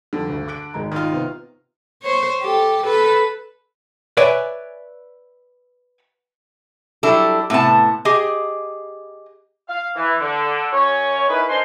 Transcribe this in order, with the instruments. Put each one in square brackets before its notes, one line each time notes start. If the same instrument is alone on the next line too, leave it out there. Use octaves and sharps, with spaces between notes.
[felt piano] F2 G3 [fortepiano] D3
[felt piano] D2 G2
D6 F#6 D7
G#1 G#3 A#5
[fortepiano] D#3 F4
[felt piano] C3 B3
[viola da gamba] C5 C#5
G4 A4
A4 B4
[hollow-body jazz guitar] B4 C#5 D5 E5 G#5
[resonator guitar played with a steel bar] F#3 G3 D4 E4 A4
A2 C3 B3 A5
G4 G#4 D#5
[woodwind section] F5
E3
D3
F#2 C#4 C#5
D#4 E4 G#4 A#4 B4
D4 D#4 A#4 C5 G#5 C6